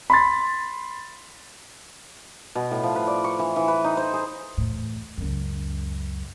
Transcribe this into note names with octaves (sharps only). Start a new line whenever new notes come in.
B5 C6 A6
B2
A2
F3
B4
D5
C#6
E3
E3
B4
D#4
C5
G#4
E2 A2
C#2 F#2